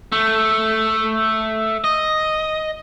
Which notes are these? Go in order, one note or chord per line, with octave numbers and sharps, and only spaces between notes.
A3
D#5